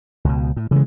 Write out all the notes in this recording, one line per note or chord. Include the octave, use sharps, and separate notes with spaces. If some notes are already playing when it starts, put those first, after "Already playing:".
C#2 B2
A2
C#3 E3 G#3